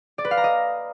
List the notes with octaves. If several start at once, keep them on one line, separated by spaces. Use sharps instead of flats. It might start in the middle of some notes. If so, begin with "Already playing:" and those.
D5
B4
F5
A#5
D#5